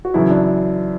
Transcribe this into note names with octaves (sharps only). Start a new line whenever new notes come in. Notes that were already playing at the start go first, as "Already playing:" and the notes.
F#4
F#2 C#3 E3 E4
D4